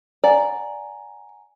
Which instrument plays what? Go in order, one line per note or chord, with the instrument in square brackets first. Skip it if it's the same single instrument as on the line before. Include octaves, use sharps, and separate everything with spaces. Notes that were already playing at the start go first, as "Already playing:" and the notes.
[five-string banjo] D5 [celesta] F#5 G#5 A#5